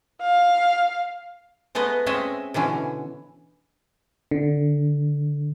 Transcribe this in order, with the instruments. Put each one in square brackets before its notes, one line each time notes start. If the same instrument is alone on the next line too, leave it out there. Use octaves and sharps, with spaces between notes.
[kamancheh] F5
[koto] G#3 A3 B3 B4 D#5
G#3 C4 C#4 D#5 E5
B2 D3 E3 C#4
[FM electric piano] D3